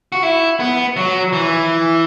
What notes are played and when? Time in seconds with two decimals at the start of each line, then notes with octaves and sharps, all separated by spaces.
0.12 F#4
0.23 E4
0.60 B3
0.97 F#3
1.33 E3